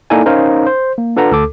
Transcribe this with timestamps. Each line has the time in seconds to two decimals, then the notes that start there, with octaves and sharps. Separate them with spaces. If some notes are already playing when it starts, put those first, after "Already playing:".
0.10 A#3 D#4 E4 A4 D5 G#5
0.26 C#4 D#4 A#4 C5 C#5 F5
0.66 C5
0.98 A#3
1.16 D4 F4 A4 B4 F#5 A#5
1.31 D2 A4 D6